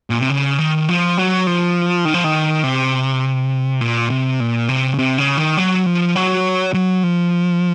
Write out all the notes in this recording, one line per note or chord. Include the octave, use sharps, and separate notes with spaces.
A#2
C3
C#3
D#3
F3
F#3
F3
D#3
F3
D#3
C3
A#2
C3
A#2
C3
C#3
C3
C#3
D#3
F#3
F3
F#3
F#3
F3